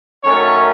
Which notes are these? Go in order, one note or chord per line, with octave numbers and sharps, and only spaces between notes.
F#2 D#3 F#3 A3 C#4 C#5